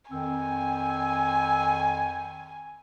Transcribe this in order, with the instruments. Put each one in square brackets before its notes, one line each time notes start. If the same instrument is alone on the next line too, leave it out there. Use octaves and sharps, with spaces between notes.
[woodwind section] F2 D#3 C4 [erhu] G#5